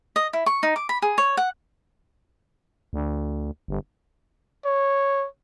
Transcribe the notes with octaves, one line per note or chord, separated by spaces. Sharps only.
D#5
E4
C#6
D#4
D6
B5
G#4
C#5
F#5
D2
G1
C#5